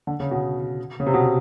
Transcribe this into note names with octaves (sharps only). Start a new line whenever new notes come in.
D3
C#3
B2
C#3
C3
B2